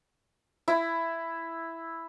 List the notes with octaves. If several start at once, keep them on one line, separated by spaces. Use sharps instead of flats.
E4